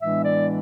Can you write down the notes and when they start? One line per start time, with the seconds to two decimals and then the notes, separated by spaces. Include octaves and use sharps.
0.01 A2 E3 G#3 B3 D4 E5
0.23 D5